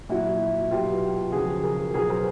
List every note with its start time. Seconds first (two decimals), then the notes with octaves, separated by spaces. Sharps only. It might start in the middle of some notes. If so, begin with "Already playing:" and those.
0.09 A#2 F#3 E4 F#4
0.71 B2 F#3 F4 G4
1.32 C#3 F3 F#4 G#4
1.63 G#4 A#4
1.94 B2 F#3 G#4 A#4
2.09 A#4 C5